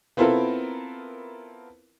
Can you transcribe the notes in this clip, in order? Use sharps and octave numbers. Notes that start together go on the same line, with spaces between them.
B3 C4 E4 F4 A4 A#4